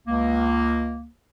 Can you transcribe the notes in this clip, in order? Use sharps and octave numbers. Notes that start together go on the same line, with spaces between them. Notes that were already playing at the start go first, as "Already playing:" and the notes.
C#2 A#3